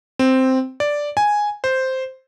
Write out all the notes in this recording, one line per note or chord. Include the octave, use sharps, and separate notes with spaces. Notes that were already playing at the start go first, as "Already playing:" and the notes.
C4
D5
G#5
C5